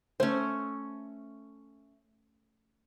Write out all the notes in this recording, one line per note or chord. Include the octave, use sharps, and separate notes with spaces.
A3 C#4 C5